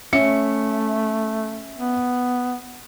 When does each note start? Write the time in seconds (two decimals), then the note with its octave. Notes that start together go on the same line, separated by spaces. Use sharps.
0.13 A3 C#4 E5 C#7
1.77 B3